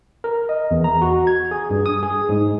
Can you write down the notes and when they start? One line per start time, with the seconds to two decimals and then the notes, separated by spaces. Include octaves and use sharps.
0.24 A#4
0.49 D#5
0.71 E2
0.84 A#5
1.02 F#4
1.27 G#6
1.51 G#4
1.70 G2
1.86 D#6
2.03 G#4
2.29 G#2